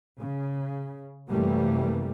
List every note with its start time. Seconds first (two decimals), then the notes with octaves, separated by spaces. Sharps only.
0.18 C#3
1.29 F#2 C3 E3 G3 A3 A#3